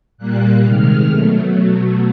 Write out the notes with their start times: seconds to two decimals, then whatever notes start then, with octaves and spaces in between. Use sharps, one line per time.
0.18 A#2 G3 A#3 F#6
0.63 C3 D#3 G#3 F6
1.09 B2 F#3 A3